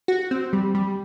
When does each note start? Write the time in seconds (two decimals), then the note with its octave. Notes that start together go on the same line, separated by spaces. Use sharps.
0.08 F#4
0.31 C4
0.53 G3
0.75 G3